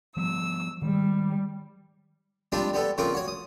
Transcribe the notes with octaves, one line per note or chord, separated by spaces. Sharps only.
F3 G3 B3 E6
D#3 G3 G#3
F3 G3 G#3 C4 D4
G3 B3 A4
C#3 F3 A#3 C4 A#4
F#4 C#5
D#6